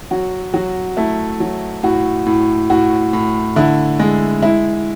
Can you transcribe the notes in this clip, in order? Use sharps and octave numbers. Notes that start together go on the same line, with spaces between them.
F#3 F#4
F#3 F#4
A3 E4
F#3
A2 F#4
A2
A2 F#4
A2
D3 E4
G#3
G#3 E4